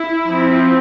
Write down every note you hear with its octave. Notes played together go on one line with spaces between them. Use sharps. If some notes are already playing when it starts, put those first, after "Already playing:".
Already playing: E4
F3 C4